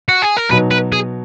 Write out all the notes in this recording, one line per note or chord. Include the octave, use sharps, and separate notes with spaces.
F#4
G#4
A#4
B2 F#3 B3 D#4 B4
B4
G#4